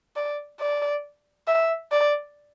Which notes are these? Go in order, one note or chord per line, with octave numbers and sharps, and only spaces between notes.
D5
D5
E5
D5